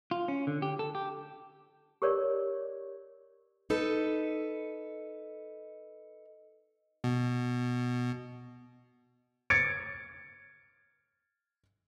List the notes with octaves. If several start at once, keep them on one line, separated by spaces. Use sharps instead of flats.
F4
C#4
D3
G4
A4
G4
G4 A#4 C#5 D5
D#4 A4 B4
B2
G#6 A6 C#7 D7